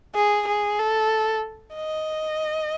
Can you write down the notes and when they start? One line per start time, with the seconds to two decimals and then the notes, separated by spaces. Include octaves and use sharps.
0.15 G#4
0.47 G#4
0.79 A4
1.75 D#5